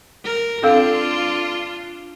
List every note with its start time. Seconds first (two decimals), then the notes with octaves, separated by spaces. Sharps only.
0.25 A#4
0.63 C4 D4 F4 A4 F5